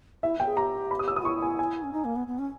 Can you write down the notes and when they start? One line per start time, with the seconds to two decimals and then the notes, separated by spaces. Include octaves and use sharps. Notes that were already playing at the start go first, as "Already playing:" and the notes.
0.23 E4 E5
0.40 G5
0.45 G#4
0.57 G4 A#5
0.91 B5
0.99 D#6
1.08 E6
1.16 D#6
1.25 E4 C#6
1.42 G#5
1.59 G#5
1.83 C#4
1.93 D#4
2.05 A#3
2.16 B3
2.27 B3
2.39 C#4